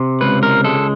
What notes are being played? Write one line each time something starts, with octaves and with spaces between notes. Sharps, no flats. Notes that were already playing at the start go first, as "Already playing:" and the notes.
Already playing: C3
C#2 B4
A#4
G#3 A4